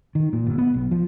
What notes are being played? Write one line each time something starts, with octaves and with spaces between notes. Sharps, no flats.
D#3
A#2
G1
B3
B1
F3